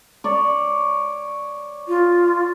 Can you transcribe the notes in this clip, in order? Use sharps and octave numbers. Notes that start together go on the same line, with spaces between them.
C#5 D5
F4